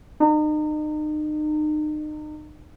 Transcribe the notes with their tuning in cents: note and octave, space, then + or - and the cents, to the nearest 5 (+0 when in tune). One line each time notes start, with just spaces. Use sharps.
D#4 -35